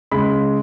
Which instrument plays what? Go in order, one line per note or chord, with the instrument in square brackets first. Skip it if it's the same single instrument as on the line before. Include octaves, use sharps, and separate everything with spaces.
[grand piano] C#3 G#3 B5